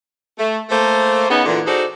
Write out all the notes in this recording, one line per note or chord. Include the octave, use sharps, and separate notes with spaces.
A3
A3 A#3 C5
C#3 B3 D#4
A#2 D3 E3
D#4 F#4 G#4 A4 C5 D5